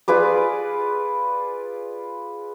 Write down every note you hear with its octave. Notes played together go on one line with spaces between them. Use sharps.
F4 G#4 B4 D5